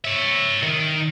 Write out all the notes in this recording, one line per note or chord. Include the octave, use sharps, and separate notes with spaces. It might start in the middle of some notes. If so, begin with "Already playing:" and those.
C#5 E5
D#3